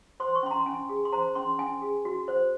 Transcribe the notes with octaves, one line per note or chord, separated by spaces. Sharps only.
C5 C6
C#6
C#4 C6
A#5
C#4 G#5
G#4
C6
C5 A#5
C#4 C6
C#4 G#5
G#4
F#4
C5